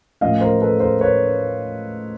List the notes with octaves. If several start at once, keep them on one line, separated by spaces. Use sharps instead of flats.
A2 F3 A#3 C#4 D#5 F5
A#4 C5
A4 B4
A#4 C5
B4 C#5